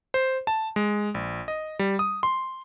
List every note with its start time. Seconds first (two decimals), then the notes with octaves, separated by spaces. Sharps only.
0.14 C5
0.47 A5
0.76 G#3
1.14 A#1
1.48 D#5
1.79 G3
1.99 D#6
2.23 C6